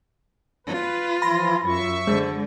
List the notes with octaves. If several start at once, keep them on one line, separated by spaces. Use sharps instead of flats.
F4 B4
E3 F3 B5 C6 A#6
F#2 F4 E5 C#6
D3 G#3 C5